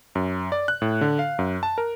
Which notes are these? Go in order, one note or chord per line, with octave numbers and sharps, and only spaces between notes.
F#2
D5
F#6
A2
D3
F5
F#2
A5
A#4